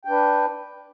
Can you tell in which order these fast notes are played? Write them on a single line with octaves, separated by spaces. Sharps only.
G5 D4 B4